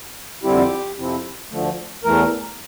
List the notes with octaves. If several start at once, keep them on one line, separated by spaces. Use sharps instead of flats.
F2 D3 G3 C4 E4 G4
F2 C3 F3 C4 E4
D2 D3 F3 A3
E2 E3 A3 A#4